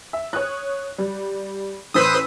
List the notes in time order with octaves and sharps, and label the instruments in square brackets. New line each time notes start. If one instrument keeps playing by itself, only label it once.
[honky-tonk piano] E5
C#5 D#6 F#6
G3
[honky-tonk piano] A1 E6 B6 [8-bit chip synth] B4 C5 D#6